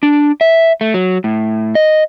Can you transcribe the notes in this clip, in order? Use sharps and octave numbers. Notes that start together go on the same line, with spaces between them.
D4
E5
A3
F#3
A2
D#5